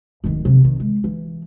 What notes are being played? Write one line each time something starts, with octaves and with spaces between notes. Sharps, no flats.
D1 D#3
C3 F3
D#3
G#3
E3